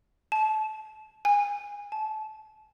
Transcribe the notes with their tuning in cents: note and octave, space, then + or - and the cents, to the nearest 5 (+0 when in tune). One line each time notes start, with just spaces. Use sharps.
A5 -25
G#5 -20
A5 -25